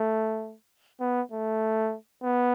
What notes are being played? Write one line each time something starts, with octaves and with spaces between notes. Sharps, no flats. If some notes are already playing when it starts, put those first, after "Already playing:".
Already playing: A3
B3
A3
B3